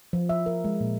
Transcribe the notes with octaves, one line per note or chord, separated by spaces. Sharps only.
F3
E5
A#4
G#3
A#2